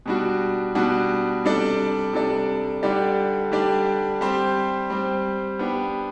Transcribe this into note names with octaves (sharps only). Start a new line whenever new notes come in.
B2 G3 D4 F#4
B2 G3 D4 F#4
C3 G3 D4 A4 D5
C3 G3 D4 A4 D5
D3 G3 D4 G4 D5
D3 G3 D4 G4 D5
G3 C4 G4 C5
G3 C4 G4 C5
B3 D4 G4